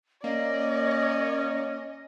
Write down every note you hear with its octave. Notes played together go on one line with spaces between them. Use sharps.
A#3 C#4 D5 D#5